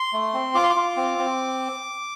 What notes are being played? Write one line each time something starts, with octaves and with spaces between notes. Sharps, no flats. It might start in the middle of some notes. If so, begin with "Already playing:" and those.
Already playing: C6
A3
C4
F4 D6
C6
D6
F4
C4
C4